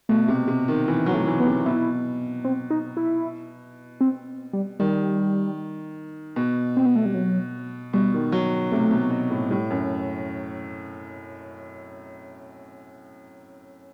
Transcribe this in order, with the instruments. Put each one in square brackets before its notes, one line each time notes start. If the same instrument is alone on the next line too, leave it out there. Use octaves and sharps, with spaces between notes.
[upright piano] B2 [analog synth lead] A3
[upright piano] C3
C3
D#3
E3
[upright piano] F#3 [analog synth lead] B3
[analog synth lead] A3
[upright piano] E3
[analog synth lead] B3
[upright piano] C3
[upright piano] B2 [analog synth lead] E4
[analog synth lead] C4
D#4
E4
C4
G3
[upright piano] D#3 [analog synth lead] G3
[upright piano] B2
[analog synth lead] C4
B3
A3
G3
F#3
[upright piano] B2 [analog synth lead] G3
[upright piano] D#3
F#3
[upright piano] C3 [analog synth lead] A3
[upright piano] B2
B2
A2
[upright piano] A2 [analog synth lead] G3
[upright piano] F#2